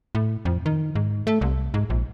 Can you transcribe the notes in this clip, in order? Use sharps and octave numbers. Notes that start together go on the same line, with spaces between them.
A2
F2
D#3
G#2
A3
C2
G#2
A#1